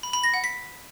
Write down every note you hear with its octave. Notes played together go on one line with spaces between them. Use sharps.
B5
B5
A#6
F#5
B6